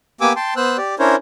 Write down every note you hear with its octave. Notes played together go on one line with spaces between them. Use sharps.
A#3 B3 G4 G#5 D6 E6
G5 A5 C6
B3 C5 E6 F#6
G4 D5
C#4 D4 E4 A#4 C5 C#5